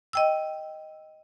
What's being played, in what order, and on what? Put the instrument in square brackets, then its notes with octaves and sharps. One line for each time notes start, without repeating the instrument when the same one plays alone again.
[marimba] D#5 G5 E6